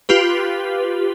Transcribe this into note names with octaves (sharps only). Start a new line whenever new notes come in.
F4 G4 B4